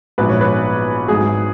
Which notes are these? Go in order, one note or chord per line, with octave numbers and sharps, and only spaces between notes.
A#1 G#2 F#3 B3 B4
C#5
B4
G#1 G#2 F#3 G#4